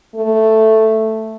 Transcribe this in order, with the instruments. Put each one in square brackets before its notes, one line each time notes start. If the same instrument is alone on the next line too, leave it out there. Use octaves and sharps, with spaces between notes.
[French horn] A3